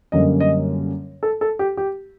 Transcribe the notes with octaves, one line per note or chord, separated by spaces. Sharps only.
F#2 D3 G3 A#3 C#4 D#5
D#5
A4
A4
G4
G4